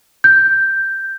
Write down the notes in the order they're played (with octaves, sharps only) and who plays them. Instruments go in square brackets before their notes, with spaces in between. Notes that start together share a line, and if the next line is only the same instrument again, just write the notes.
[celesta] G6